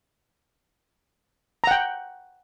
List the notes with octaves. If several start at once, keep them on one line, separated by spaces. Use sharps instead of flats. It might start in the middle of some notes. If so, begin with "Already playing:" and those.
F#5 G5 A#5